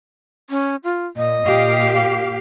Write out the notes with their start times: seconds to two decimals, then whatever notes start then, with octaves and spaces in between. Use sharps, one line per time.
0.50 C#4
0.84 F4
1.17 A#2 D#5
1.45 A#2 G4 F5